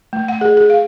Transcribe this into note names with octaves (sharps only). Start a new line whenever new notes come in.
A3
F#5
G#4
G#4
F5